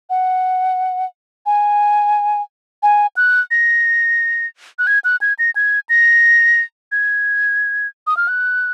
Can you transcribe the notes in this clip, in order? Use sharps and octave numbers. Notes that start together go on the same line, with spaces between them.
F#5
G#5
G#5
F#6
A#6
F#6
G#6
F#6
G#6
A#6
G#6
A#6
G#6
D#6
F6
F#6